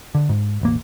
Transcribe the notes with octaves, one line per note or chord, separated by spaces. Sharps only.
D3
G#2
E1 A1 A#3